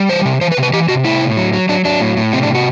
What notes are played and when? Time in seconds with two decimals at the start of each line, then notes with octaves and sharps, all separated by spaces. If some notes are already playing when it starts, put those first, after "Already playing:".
Already playing: G3
0.09 E3 C5
0.25 C3
0.41 E3 C5
0.52 B4
0.57 C3
0.63 B4
0.73 E3 G4
0.89 C3 F#4
1.04 A2 E4
1.21 A2
1.37 F#3
1.53 F#3
1.69 F#3 D4
1.85 F#3 D4
2.01 A2
2.17 A2
2.33 C3 C4
2.43 D4
2.49 C3
2.55 F#4